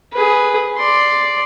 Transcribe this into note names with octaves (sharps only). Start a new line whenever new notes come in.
G#4 B4
D5 C6